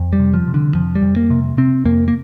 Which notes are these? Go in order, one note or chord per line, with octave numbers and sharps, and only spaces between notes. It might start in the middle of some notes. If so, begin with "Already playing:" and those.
Already playing: F2
G3
C3
F3
C3
D3
F2 F3
G3
F2
A#3
C3
C3 C4
F2 A#3
A#3